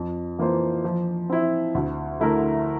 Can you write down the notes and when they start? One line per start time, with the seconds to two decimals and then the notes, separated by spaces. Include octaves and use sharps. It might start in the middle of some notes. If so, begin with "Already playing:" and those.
Already playing: F2
0.39 E3 A#3 F4 C5
0.84 F3
1.30 C4 E4
1.75 D2
2.20 D3 A3 E4 A#4